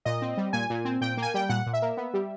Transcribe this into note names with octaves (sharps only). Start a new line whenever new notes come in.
A#2 D#5
C4
G3
A#2 G#5
A#2
C4
A#2 G5
A#3
G#5
G3 G5
A#2 F#5
A#2
E5
A#3
B3
G3